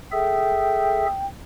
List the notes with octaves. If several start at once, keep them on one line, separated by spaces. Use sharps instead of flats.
G#4 A4 E5 G5